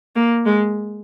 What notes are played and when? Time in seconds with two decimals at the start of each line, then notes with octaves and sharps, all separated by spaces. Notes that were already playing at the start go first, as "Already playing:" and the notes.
0.16 A#3
0.46 G#3